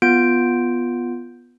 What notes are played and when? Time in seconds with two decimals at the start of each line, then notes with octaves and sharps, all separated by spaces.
0.02 B3 F4 G6 D7